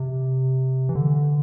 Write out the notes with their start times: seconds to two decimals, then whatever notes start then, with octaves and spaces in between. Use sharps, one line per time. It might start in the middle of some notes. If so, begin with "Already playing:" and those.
Already playing: C3
0.89 E3
0.95 D3